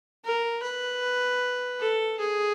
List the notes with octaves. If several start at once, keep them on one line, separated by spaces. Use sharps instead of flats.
A#4
B4
A4
G#4